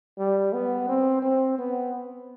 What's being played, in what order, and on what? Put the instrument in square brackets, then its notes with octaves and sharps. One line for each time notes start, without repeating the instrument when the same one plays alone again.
[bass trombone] G3
B3
C4
C4
B3